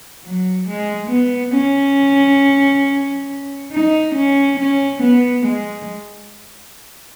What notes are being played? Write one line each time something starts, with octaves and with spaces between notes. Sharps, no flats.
F#3
G#3
B3
C#4
D#4
C#4
C#4
B3
G#3